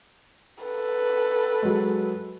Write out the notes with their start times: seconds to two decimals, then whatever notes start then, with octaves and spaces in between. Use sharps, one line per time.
0.64 A4 B4
1.63 F#3 G#3